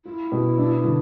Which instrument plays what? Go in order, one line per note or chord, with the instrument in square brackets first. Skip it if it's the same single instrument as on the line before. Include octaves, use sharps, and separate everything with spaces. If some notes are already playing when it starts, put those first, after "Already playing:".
[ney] E4 [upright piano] F4
[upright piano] B2
D4
D3